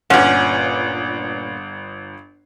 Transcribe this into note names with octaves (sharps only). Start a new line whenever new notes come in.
G1 A#2 C#4 F#5